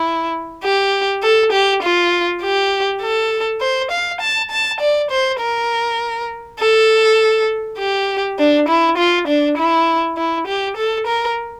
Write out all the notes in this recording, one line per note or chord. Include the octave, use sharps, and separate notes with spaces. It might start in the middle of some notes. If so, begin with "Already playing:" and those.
Already playing: E4
G4
A4
G4
F4
G4
A4
C5
F5
A5
A5
D5
C5
A#4
A4
G4
D4
E4
F4
D4
E4
E4
G4
A4
A#4